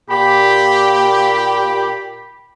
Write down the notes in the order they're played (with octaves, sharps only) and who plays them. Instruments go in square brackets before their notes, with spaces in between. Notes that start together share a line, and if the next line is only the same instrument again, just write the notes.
[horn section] A#2 G4 [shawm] B5